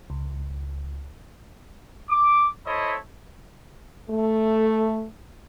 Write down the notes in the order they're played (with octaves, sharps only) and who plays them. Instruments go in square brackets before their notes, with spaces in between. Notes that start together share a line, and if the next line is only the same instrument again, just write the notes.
[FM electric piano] C#2
[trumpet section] D6
E4 A4 C5 C#5 D#5 B5
[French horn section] A3